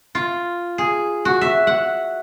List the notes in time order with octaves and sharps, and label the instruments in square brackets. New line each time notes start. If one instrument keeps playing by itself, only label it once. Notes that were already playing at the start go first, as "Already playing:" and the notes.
[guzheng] F4
G#4
F#4
E5
F#5